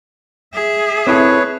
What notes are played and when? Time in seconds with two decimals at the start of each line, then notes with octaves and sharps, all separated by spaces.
0.54 G#4 E5
1.07 C4 E4 A4 B4 C#5